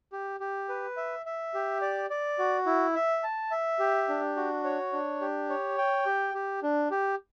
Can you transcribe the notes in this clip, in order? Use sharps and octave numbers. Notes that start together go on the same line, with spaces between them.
G4
G4
B4
E5
E5
G4
D5
D5
F#4
E4
E5
A5
E5
G4
D4
F#4
C#5
D4
G4
C#5
G5
G4
G4
D4
G4